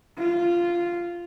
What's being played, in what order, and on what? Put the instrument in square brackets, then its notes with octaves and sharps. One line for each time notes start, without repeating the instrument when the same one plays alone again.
[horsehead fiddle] F4